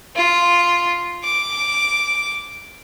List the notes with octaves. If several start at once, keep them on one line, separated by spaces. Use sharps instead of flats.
F4
D6